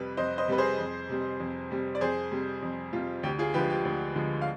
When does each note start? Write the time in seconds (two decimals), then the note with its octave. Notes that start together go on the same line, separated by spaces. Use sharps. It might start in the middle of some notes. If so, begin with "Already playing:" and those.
Already playing: F2 C3 G3 B4
0.17 F2 C5 D#5
0.38 C5 D#5
0.48 C3 G3 B4
0.58 G#4 C5
0.79 F2
1.09 C3 G3
1.40 F2
1.71 C3 G3
1.95 D5
2.01 F2 G#4 C5
2.31 C3 G3
2.62 F2
2.93 C3 G3 F4
3.23 D2 G4
3.39 F4 G#4
3.54 D3 F3 G#3 G4 B4
3.70 G4
3.85 D2
4.16 D3 F3 G#3
4.41 F5